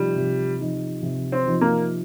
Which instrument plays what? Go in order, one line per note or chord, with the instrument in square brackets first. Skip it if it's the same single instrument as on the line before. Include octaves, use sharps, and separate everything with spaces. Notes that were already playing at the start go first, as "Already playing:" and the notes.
Already playing: [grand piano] C3 F3 D#4 [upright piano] G3
[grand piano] C3
F3 D#4
C3
[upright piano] C4
[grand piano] F3 D#4
[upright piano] A#3